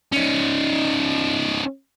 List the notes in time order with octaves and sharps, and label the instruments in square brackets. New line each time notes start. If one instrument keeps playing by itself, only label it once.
[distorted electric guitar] C#4 D#4